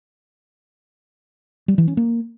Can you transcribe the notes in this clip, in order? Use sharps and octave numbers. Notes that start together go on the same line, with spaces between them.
G3
E3
C#4
A#3